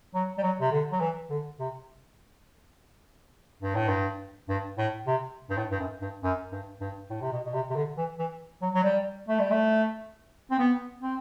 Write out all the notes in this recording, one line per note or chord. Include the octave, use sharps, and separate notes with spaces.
F#3
G3
F#3
C3
D3
F#3
E3
D3
C3
G2
A2
G2
G2
A2
C3
G2
A2
G2
F#2
G2
F#2
G2
G2
A2
C3
B2
B2
C3
C3
D3
E3
E3
F#3
F#3
G3
A3
G3
A3
C4
B3
C4